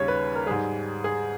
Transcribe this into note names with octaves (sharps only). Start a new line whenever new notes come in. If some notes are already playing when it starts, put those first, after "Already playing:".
Already playing: D#2 C#3 G3 C#5
B4
A#4
G#2 G3 G#4
G#4